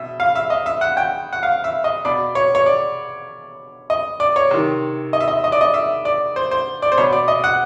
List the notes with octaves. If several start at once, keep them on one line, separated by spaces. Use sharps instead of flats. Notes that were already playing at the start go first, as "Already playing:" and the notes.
Already playing: B2 E5
F5
E5
D#5
E5
F#5
G5
F#5
F5
E5
D#5
B2 D5
C#5
C#5
D5
D#5
D5
C#5
C3 D#3
D#5
E5
D#5
D#5
D5
D#5
E5
D5
C5
C5
D5
C5
B2 C#5
D5
D#5
F#5